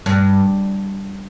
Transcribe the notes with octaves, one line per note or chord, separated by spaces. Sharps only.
G2